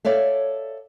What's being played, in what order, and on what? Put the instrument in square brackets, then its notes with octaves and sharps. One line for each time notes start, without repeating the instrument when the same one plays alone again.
[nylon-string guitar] A4 C#5 D5 E5 F5